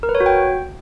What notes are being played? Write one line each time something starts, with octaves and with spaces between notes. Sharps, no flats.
A#4
B4
C#5
F#4
G5